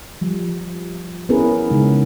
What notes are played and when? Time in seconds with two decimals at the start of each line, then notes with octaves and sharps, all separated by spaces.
0.21 F3 G3
1.29 B3 C#4 E4 G#4 A#4 B4
1.71 C#3 G#3 D#4